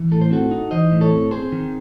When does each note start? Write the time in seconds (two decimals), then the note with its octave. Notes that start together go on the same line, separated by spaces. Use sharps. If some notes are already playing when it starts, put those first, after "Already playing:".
Already playing: E3
0.11 A2 A4
0.21 C5
0.31 C4 F#4 A4
0.51 D#4
0.71 E3 C5 D#5
0.91 A2
1.01 A4 C#5
1.11 C4
1.31 C4 G#4 C5
1.52 D#3